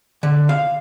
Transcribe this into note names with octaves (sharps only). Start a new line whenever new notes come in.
D3
F5